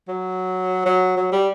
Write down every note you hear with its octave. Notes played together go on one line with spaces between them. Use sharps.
F#3
F#3
F#3
G3